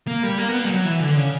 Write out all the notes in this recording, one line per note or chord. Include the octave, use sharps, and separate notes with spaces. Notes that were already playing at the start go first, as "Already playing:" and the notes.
A#3
G3
A#3
B3
A#3
G3
F#3
E3
D3
C#3